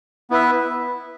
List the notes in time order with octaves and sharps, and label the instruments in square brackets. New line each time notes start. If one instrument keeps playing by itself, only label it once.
[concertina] B3 E4 B4 E5